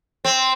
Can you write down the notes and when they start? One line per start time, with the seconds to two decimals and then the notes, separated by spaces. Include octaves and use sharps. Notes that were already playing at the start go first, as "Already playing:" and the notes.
0.25 C4